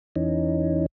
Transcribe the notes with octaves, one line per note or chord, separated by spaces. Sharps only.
E2 E3 C#4 D#4